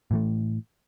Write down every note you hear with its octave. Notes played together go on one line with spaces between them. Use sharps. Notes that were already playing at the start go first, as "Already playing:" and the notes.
A2 E3 A3